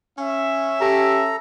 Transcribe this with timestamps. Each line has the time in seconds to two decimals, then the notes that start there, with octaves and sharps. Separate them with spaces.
0.18 C#4 E5
0.81 G4 A4 A#5